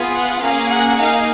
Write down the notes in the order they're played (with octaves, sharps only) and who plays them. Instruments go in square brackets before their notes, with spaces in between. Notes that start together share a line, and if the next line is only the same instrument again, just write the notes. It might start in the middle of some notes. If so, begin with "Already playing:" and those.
Already playing: [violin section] B3 F4 G#4
F#5
A#3 C#4 G#4 F5
F#5
A#3 D#4 G#4 F5